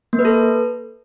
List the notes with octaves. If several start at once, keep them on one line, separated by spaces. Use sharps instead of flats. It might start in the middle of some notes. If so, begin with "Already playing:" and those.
A#3
B4
A4